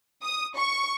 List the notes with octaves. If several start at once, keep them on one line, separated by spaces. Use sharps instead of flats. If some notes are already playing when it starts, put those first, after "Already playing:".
D#6
C#6